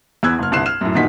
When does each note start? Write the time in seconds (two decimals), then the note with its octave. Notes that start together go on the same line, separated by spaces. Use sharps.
0.23 E2 B3 B4 E6 F#6 G#6
0.39 F#1 F6
0.52 G1 C2 F#6 C7 E7
0.66 F6 E7
0.81 F#2 A2
0.95 G1 A#2 D#3 D#4 F#4 B6